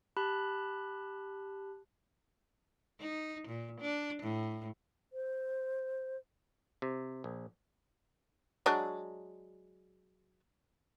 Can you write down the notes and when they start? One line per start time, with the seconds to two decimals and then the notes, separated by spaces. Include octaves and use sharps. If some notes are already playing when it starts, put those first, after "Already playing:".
0.17 G4 A5 B5 F#6
3.00 D#4
3.48 A#2
3.80 D4
4.23 A2
5.13 C5
6.82 C3
7.24 A#1
8.66 F#3 G#3 D4